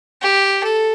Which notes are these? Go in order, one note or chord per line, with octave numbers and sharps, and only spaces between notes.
G4
A4